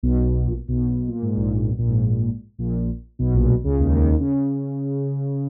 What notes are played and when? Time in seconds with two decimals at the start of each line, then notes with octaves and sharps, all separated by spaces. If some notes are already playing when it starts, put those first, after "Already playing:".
0.03 B1 B2
0.47 A#1 A#2
0.68 B1 B2
1.08 A#2
1.22 G#2
1.36 A#1 A#2
1.68 B1 B2
1.78 A#1 A#2
1.88 G#2
2.59 A#1 A#2
3.19 B1 B2
3.34 A#1 A#2
3.50 B1 B2
3.64 C#2 C#3
3.80 D#2 D#3
3.95 D#2 D#3
4.10 D#2 D#3
4.20 C#3